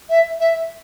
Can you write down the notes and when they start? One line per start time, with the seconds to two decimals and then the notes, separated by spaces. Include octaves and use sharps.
0.09 E5
0.39 E5